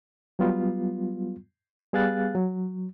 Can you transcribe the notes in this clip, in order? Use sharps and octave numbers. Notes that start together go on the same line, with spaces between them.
F#3 G3 B3 F4
G3 B3 G#4 F5 F#6 A6
F#3